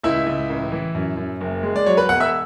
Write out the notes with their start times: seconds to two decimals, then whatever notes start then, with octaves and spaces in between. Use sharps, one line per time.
0.03 C#2 E4 E5
0.26 C#2
0.50 A1
0.72 E3
0.95 F#2
1.17 F#2
1.41 F#1
1.63 G#3
1.76 D5
1.86 F#3 C#5
1.97 B4 B5
2.09 E1 F#5 F#6
2.20 E5 E6